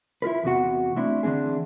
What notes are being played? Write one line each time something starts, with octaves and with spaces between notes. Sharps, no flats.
E4 F4 A#4 B4
E2 C3 B3 F#4 F#5
A3 C4 D4 E4
D3 E3 C4 D4 G#4